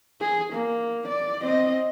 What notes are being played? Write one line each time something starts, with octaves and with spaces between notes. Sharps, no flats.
G#4
A#3
D5
C4 D#5